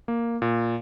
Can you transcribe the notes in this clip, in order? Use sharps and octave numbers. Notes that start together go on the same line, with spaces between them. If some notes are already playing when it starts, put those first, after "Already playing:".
A#3
A#2